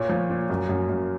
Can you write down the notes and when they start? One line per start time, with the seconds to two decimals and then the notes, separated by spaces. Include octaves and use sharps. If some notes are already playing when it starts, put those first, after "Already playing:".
Already playing: A#2 C#5
0.09 F3
0.30 A#2
0.50 F#2
0.69 F#2
0.89 F#2